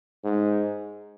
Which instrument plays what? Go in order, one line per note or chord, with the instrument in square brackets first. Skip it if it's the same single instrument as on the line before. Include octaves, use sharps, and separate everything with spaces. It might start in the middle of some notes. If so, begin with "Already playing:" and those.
[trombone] G#2